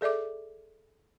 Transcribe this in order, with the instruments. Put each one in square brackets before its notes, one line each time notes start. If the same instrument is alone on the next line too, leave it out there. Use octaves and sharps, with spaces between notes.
[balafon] G#4 A4 D5 E5 D6